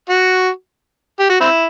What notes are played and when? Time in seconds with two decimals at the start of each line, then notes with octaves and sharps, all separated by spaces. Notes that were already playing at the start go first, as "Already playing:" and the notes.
0.10 F#4
1.19 G4
1.29 F#4
1.40 C4 E4